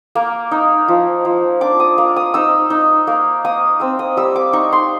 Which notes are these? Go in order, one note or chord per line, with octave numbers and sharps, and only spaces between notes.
A#3
D#4
F3
F3
D4 D6
D#6
A#3
D#6
D#4 E6
D#4
A#3
A#3 D#6
C4 E6
D#6
G3 E6
D6
D#4 C#6
C6